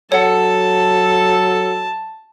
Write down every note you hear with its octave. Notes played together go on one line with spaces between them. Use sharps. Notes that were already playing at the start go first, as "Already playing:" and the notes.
F#3 A4 C#5 F#5 A5